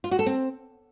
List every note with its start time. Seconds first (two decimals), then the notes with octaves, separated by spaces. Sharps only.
0.04 F4
0.11 F#4
0.19 A4
0.26 C4